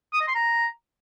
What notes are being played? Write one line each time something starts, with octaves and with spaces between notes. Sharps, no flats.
D#6
D#5
C6
A#5